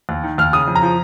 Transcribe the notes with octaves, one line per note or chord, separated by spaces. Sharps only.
D#2
D#3
D#2 F6
C#3 D#6
F2
A#5
F3